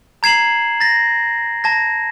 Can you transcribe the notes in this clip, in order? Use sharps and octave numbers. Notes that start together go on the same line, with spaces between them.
A#5 G#6 C7 E7 F#7
A6 A#6
A5 G#6 A#6